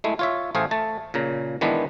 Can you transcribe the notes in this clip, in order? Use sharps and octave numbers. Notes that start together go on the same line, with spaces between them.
G#3 A3 E4
F4 C#5 E5
A1 A3 G#4 C5 F5
A3 A5
A#2 C#3 A#5
D#3 E3 G#3 B3 D4